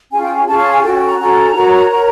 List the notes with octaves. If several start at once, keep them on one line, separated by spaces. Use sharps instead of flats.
C#4 F4 G#4 G#5
G5
G#5
C#4 F4 G#4 A5
A5
G#5
C#4 F#4 A4 G5
G5
A#5
C#4 F#4 A4 A#5
F#4 A#4 C#5
F#4 A#4 C#5